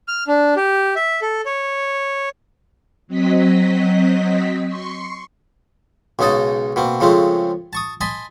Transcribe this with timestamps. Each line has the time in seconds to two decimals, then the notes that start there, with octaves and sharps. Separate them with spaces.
0.08 F6
0.27 D4
0.57 G4
0.96 E5
1.22 A4
1.46 C#5
3.07 F#3 C4 D#5 B6
4.66 C6 C#6
6.19 B1 C#3 G#3 D#4 D#5 A5
6.76 B2 A#3 C4
7.00 C#3 F3 G#3 A3 C4
7.73 A5 C#6 D#6
8.01 D#5 G#5 A5 B5 C6